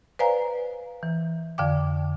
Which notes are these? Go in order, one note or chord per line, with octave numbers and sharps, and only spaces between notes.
B4 C5 D5 F5 G#5 A#5
E3
F2 D3 D5 F5 G5 D6